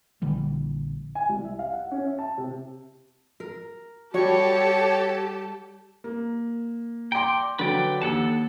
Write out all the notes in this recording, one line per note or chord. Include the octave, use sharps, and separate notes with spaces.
A#1 D3 E3 G3
G#5
C2
E5
F5
F#5
C#4
E5
A5
C3
A#4
G3 F#4 G4 A4 C#5 A5
A#3
D5 G5 A#5 C6
D3 F#3 B4 D5 G5
D#2 A4 F#5 A5